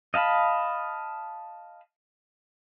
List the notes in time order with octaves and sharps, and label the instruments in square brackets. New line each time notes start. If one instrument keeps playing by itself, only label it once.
[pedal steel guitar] D#5 F5 A5 B5